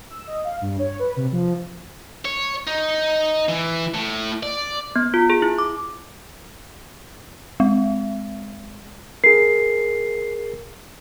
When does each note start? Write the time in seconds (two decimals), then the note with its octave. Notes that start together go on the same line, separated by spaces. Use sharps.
0.10 E6
0.27 D#5
0.44 F5
0.61 G2
0.79 C#5
0.99 B4
1.16 C3
1.32 F3
2.25 C#5
2.67 D#4
3.49 E3
3.94 A2
4.43 D5
4.96 B3
5.14 F4
5.30 G#4
5.42 E4
5.58 D6
7.60 G#3
9.24 G#4 A#4 C7